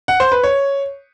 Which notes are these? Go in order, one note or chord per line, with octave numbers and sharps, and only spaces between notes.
F#5
C5
B4
C#5